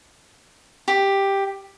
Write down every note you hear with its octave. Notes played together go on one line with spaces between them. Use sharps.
G4